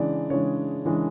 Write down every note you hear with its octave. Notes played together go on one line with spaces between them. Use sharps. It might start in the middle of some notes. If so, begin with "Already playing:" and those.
Already playing: C#3 E3 G#3 D4 D5
C#3 E3 G#3 D4 C#5
C#3 E3 G#3 D4